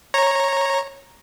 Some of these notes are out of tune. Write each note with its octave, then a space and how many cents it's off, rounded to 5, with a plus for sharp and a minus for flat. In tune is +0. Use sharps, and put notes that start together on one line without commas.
C#5 -15 A#5 +0